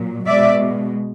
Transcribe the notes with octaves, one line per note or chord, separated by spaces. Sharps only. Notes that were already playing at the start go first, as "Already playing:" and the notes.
Already playing: A#2 F#3
B2 G#3 D5 E5